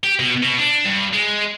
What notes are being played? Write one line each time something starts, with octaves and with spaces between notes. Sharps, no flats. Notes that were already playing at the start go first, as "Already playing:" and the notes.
G4
B2
B2
D4
G2
G#3